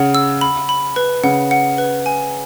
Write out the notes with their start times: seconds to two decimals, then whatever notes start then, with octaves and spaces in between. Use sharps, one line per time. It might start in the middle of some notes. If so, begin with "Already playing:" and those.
Already playing: C#3 F#5
0.15 E6
0.41 B5
0.69 B5
0.96 B4
1.24 C#3 F#5
1.51 F#5
1.78 B4
2.06 G#5